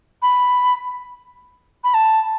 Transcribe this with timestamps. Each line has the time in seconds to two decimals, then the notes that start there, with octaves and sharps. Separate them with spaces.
0.23 B5
1.84 B5
1.94 A5